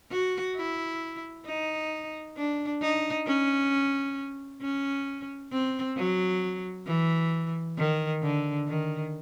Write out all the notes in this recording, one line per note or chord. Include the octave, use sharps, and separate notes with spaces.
F#4
E4
D#4
D4
D#4
C#4
C#4
C4
F#3
E3
D#3
D3
D#3